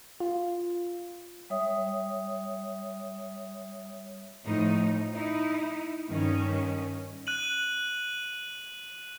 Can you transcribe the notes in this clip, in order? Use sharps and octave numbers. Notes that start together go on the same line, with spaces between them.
F4
G3 C#5 E5 D#6
A2 F3 D#4
D#4 E4
G2 D#3 C#4
F#6 D#7 F#7